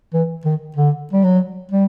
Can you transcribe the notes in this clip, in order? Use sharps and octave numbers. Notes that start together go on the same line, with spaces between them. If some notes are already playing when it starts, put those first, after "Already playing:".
E3
D#3
D3
G3
F#3
G3